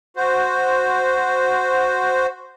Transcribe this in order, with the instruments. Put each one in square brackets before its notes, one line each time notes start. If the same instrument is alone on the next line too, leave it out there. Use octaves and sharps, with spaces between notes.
[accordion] F#4 C5